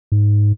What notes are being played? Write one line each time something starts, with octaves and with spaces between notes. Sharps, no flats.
G#2